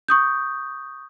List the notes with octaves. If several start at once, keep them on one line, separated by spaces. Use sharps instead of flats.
C#6 D#6 G6